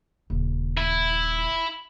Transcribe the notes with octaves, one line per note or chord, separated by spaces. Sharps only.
D#1 C#3
E4